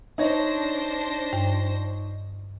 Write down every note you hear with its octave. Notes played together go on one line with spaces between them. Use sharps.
D4 D#4 C5 C#5 A#6
G2